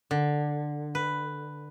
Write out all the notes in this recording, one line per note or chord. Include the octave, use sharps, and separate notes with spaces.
D3
B4